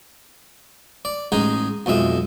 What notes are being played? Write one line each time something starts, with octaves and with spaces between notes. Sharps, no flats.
D5
A1 G#3 D#4 G#4
B1 F2 G#3 E5